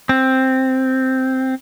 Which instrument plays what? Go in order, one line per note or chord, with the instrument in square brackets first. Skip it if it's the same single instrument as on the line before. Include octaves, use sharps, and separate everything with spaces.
[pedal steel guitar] C4